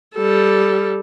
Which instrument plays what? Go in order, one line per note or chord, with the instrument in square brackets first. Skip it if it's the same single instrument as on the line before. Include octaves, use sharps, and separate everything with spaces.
[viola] G3 A4